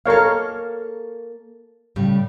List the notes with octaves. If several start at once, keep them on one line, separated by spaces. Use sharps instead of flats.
A#3 A4 A#4 C#5 F5
A2 C#3 G3